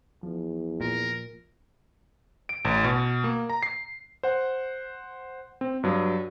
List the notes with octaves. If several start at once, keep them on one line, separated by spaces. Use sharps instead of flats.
E2 F3
A#2 A#4
D7
A1
B2
A#3
A#5
C7
C5 F#5
C4
G2 F#3